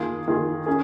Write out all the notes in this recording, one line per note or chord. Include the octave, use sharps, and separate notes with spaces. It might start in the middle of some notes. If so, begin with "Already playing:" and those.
Already playing: D#3 A#3 F4 G#4
D#3 A#3 F4 G#4
C#4 G#4